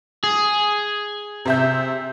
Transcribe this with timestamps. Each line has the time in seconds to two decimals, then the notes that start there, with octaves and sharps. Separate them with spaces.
0.24 G#4
1.45 C3 E5 G6